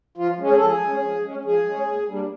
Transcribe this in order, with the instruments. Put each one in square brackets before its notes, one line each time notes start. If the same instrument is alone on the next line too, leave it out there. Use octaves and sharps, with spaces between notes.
[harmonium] F3 F4
G#3 C#4
G#4
F3 A4
G#4
G#3 C#4
F3
G#3 C#4
F3 G#4
G#3 C#4
A#2
G3 A#3 D4